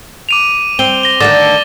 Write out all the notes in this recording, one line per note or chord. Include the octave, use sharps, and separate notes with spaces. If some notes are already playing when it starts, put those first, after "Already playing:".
D6 D#7 F7
C4 G7
A#6 G7
D3 D#3 A3 D6 A6 A#6